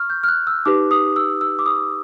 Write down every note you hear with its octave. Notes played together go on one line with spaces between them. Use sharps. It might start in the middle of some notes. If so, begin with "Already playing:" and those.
Already playing: C#6 F6
G6
F6
F#6
E6
D#4 G4 B4 D6
D#6
E6
E6
D6
D#6